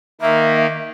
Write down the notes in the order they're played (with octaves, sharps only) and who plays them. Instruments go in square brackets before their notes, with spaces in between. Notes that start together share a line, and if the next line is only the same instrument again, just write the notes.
[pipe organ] D#3 A#3 [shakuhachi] E5